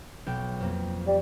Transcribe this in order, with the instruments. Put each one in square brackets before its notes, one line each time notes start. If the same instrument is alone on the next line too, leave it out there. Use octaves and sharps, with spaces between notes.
[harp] B1 G5
F2 A#3
[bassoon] G3